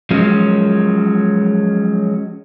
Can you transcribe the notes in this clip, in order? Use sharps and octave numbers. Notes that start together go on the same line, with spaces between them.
F3 F#3 G#3 C#4